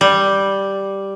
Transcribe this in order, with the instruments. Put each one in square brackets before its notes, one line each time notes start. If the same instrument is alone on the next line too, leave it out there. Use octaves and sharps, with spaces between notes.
[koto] G3